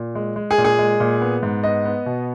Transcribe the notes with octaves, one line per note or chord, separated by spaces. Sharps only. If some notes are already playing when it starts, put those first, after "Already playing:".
Already playing: A#2
G#3
G#3
G#4
A#2
G#4
G#3
A#2
B3
G#2
B3 D#5
B3
B2